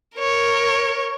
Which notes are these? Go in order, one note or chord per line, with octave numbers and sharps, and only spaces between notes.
A#4 C#5